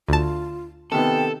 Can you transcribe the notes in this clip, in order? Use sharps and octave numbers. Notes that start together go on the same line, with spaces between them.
D2 F4 A5
C3 D#3 B3 A4 G5